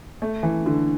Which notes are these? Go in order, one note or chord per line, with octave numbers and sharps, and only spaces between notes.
A3
E3
D3